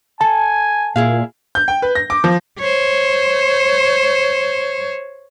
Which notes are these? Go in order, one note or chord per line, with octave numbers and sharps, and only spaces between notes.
A4 G#5 A5
A#2 E4 G#4 F5
G6
G5
B4
A#6
D6
F3
C5 C#5